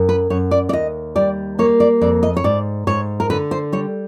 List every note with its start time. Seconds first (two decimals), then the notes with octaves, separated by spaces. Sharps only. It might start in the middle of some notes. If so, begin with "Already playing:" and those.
Already playing: F#2
0.09 B4
0.30 F#2 C#5
0.51 D5
0.69 D5
0.73 D#2 D#5
1.16 G3 D5
1.59 A#3 C#5
1.80 D5
2.01 F2 D5
2.23 D#5
2.37 C#5
2.44 G#2 D5
2.87 G#2 C#5
3.20 A#4
3.30 D3 B4
3.51 C5
3.72 G3 C#5